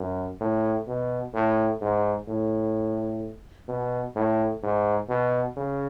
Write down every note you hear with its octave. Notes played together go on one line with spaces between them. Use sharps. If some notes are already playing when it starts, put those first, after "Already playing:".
Already playing: F#2
A2
B2
A2
G#2
A2
B2
A2
G#2
B2
C#3